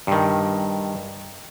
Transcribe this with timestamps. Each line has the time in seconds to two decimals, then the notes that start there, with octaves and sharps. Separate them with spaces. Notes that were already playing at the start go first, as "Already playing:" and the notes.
0.07 G2 D#3